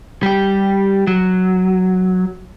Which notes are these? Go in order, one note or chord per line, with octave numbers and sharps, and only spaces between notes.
G3 G4
F#3